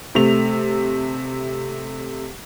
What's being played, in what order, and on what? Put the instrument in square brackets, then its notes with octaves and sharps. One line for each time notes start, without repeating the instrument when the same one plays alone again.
[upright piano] C3 A3 F7